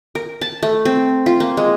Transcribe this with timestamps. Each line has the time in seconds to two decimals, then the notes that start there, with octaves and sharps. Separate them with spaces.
0.15 A#4
0.41 A5
0.63 A3
0.85 C4
1.26 F4
1.40 A#3
1.57 G#3